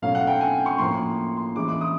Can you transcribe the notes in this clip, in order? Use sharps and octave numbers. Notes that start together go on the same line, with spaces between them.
B2 F#3 A3 C#4 F5
F#5
G5
G#5
C#6
A2 F3 A#3 C6
C6
E3 G#3 C#4 E4 D6
D6
D#6